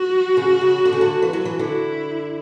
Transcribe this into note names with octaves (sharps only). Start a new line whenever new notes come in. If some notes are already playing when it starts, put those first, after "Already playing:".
Already playing: F#4
C#3
C#3
D3
C#3
D3
E3
F#3
E3
D3 E4